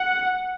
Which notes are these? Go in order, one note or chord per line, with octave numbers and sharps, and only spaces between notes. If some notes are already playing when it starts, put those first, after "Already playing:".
Already playing: F#5